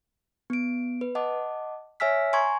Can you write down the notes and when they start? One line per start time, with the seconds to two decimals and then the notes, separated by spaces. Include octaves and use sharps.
0.50 B3 D7
1.01 B4
1.15 D#5 F#5 A5 D6
2.00 C#5 E5 G#5 E6 F6 B6
2.33 G#5 A#5 C6 C#6 G#6